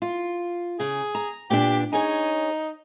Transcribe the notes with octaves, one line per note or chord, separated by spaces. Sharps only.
F4
C#3 G#4
A#5
A#2 B3 D4 G4
D#4 G#4 C#5 G#5